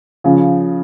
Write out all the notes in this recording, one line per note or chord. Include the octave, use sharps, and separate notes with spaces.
C#3 F3